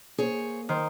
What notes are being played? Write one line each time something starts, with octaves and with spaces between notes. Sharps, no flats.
A#3 G#4 C5 C#5
D#3 C5